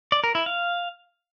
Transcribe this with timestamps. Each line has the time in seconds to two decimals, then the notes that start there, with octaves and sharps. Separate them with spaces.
0.12 D5
0.24 A#4
0.35 E4
0.46 F5